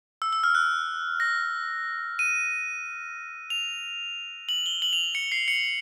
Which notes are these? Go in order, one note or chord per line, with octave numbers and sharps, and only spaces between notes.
E6
E6
F6
F#6
A#6
D#7
F7
F#7
G7
F#7
F7
C#7
C7
C#7